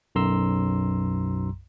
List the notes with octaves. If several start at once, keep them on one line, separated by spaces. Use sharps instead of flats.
B1 F#2 A#5 C6 E6